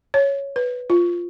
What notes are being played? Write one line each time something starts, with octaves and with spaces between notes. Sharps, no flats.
C#5
B4
F4